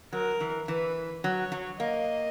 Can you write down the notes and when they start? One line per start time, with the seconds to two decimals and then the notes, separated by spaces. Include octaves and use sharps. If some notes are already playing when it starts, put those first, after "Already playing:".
0.12 F#3 A#4
0.40 E3
0.68 E3 B4
1.24 F#3 C#5
1.52 F#3
1.80 A#3 D#5